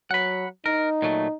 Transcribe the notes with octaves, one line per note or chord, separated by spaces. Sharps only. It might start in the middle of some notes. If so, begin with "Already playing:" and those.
F#3 F#5 B5
D#4 A#4
A#2 F#3 A3